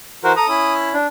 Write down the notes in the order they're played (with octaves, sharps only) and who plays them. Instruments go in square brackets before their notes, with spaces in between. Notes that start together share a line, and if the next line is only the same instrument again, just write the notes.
[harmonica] E3 [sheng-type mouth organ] F#4 A#4 C5
[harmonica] A4 A#5 [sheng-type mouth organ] D#6
[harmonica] C#4 E4
[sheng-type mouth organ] D4